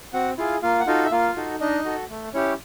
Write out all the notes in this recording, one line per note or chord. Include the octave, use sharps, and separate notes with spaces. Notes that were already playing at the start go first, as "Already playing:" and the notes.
C4 F#4 F#5
E4 F4 G#4 F5
A#3 F4 F5
F#5
D#4 F4 F#4 A4 F5
E5
A#3 F4 F5
D#4 F#4 A4
D4 D#4 D#5
F#4 A4
A3
C#4 E4 G4 C#5